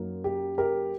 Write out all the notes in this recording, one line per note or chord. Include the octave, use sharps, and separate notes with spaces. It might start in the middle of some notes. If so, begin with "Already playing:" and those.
Already playing: F#2 F#3 A#3 D#4
G4
G4 A#4